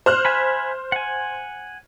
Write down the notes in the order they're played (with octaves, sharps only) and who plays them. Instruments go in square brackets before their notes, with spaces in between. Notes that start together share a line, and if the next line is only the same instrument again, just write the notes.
[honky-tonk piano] C5 F6 F#6
[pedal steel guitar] E5 G#5 B5
F#5 G#5